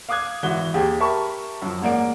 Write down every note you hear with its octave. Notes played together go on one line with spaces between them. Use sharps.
F5 D6 D#6 F#6 G#6
G#1 E3 F#4 G7
D#2 G4 G#4
G4 A#4 E5 A5 B5 C#6
F#2 F3
A1 G#2 A#3 D5 F#5 D7